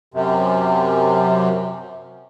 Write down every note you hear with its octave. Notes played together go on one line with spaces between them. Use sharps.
F#2 C3